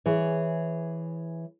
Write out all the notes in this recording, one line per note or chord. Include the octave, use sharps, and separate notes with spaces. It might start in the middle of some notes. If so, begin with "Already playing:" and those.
E3 G#4 C#5